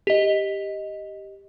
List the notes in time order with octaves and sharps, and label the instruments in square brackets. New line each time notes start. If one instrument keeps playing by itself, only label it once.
[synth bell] G4 D#5